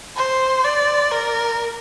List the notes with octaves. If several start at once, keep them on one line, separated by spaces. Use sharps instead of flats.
C5
D5
A#4